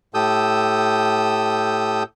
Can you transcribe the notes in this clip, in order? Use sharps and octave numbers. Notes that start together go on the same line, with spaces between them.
A2 G4 A4 D#6 E6 G6